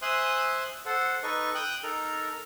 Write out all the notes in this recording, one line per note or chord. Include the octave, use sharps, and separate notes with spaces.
C5 E5 G#5 C6 D#6 F#6
A4 C5 F#5
D#4 A4 B4 D#5 C#6
G5 D#6 F#6 G6
D#4 A4 A#4 A#5